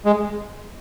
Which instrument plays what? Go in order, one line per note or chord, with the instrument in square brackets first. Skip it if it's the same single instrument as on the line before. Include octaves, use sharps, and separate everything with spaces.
[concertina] G#3